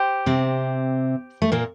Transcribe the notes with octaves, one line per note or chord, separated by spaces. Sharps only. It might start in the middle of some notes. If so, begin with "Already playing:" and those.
Already playing: G4 C5
C3 C4
A3
A#2 A#3